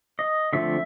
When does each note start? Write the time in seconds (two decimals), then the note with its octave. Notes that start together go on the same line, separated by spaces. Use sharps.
0.19 D#5
0.53 D3 F3 A3 C4 E5